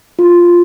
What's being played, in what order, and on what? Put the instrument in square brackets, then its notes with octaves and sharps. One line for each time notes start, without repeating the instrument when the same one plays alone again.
[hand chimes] F4